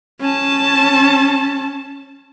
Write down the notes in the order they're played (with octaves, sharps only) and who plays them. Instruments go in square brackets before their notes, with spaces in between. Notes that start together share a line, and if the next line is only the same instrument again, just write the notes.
[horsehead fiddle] C#4 A5